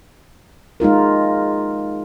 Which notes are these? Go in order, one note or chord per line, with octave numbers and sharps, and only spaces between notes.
G#3 D#4 F4 A#4